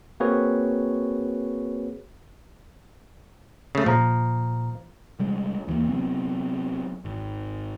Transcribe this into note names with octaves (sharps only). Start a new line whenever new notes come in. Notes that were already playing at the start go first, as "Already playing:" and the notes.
A#3 C4 F#4 G#4 B4 C#5
C#3 A3
A#2 F3 A#5
C3 G3 G#3
D#2 E3 F#3 A#3
C3 F#3 B3 C4
G#1